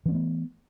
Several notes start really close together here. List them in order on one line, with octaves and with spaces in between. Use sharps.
E3 C#4 A3 B3